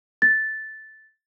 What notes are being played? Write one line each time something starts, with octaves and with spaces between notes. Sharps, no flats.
A6